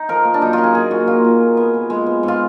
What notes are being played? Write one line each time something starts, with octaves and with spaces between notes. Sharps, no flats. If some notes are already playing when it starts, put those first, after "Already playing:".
Already playing: D#4
F3 A#4
A#3
D4
F#2 D#4
F4
F#2
G#4
A#2 G#4
A#2 F#4
A#2 F4
A#2
A#2
B3
A#2
G#3
B3
G#2
F4